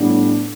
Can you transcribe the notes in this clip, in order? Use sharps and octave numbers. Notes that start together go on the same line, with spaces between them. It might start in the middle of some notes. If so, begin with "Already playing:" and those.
Already playing: A2 G3 B3 D4